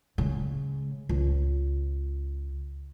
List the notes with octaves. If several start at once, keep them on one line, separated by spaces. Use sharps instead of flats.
C#3 G#3
C#2